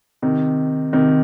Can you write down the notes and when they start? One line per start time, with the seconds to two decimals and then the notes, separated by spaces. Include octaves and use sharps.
0.22 C3 D#3
0.93 C3 D#3